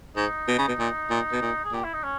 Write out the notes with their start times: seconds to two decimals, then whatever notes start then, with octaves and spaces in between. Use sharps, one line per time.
0.16 G#2 D#4
0.48 B2
0.58 C#3
0.68 B2
0.79 A#2
1.10 A#2
1.32 B2
1.42 A#2
1.65 G#4
1.72 A#2 G4
1.84 E4
1.93 D#4
2.03 C#4